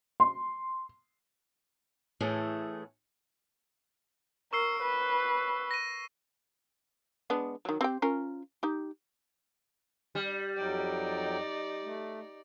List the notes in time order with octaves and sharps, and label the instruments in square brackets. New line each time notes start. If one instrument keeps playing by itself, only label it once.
[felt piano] C6
[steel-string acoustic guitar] A2 E3 A3 G#4
[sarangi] A#4 [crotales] C#6 E6 C7
[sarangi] B4
[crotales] A#6 D#7
[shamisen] G#3 B3 D4
D#3 F#3
C4 G4 G5
C#4 F4 A#4
D#4 G4
[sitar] G3
[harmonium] F2 F#3 G5 [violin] D#4 D5
[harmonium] A3